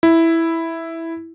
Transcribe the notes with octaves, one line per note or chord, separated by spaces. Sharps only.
E4